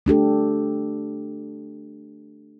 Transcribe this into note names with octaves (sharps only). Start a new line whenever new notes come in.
A3 D4 G4 A4